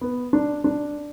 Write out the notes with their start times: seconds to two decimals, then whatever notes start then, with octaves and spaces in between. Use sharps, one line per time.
0.01 B3
0.33 D4
0.64 D4